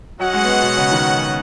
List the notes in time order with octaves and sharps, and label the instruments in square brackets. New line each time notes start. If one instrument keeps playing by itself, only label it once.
[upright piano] F#3 [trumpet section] C#4 F#4 D#5 F#5
[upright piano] G#3
B3
G#3
B2
C#3
D#3